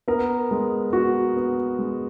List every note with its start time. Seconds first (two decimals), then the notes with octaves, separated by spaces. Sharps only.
0.08 B3 A#4
0.51 G#3
0.93 B3 F#4
1.37 B3
1.79 G#3